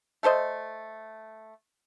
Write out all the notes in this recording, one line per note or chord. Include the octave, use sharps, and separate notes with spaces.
A3 A4 C5 D#5